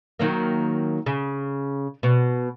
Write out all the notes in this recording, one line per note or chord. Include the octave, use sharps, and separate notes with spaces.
D#3 F#3 A#3
C#3
B2